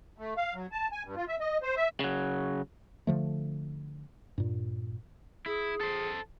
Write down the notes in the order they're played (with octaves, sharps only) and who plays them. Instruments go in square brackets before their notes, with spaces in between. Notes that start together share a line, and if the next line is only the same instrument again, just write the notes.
[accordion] A3
F5
F#3
A5
G#5
G2
F4
E5
D#5
C5
E5
[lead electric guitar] C#3 F#3
[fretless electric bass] D3 F3 A3
G2 A#2
[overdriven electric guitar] E4 [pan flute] G#4
[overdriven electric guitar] A4 C5